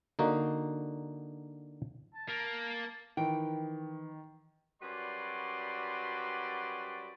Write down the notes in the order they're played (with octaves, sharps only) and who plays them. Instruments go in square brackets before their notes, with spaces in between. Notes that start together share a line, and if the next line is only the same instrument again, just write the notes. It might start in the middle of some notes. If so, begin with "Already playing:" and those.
[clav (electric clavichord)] D3 A#3 D#4 F#4
[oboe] A5
[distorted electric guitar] A#3
[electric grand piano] D#3 [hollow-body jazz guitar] E3 [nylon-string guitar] G5
[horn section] F#2 G3 F#4 B4 D5 C6